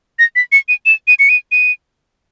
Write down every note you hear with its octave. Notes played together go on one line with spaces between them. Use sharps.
A#6
B6
C#7
D#7
E7
D#7
C#7
D#7
D#7